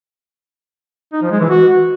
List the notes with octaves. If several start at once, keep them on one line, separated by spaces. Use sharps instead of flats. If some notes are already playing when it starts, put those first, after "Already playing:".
D#4
F3
G#3
E3
F#4